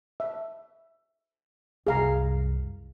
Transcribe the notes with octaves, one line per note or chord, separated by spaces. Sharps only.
E5
C2 F#2 G#4 F5 A#5